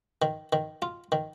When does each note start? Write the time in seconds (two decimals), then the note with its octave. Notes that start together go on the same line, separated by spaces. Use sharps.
0.22 D#3
0.53 D#3
0.82 F4
1.12 D#3